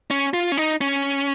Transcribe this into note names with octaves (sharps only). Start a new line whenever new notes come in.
C#4
F4
C#4
D#4
C#4